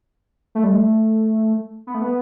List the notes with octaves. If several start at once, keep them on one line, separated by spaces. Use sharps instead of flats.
A3
G3
A3
B3
A3
B3